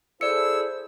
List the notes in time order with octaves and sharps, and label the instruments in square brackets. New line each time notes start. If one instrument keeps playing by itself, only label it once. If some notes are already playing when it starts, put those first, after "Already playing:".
[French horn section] E4 G#4 A4 [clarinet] C5 [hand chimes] D5 C#7 [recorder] E6